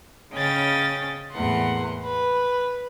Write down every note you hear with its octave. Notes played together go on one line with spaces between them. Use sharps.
C#3 C#4 D#5 G5 A6
E2 A2 A#3 F#5 C6
B4